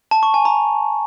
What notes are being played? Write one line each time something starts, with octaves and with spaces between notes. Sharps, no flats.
A5
C#6
G#5
A#5